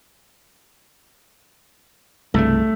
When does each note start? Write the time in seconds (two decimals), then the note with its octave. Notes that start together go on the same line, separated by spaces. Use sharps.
2.34 C2 G2 C#3 A3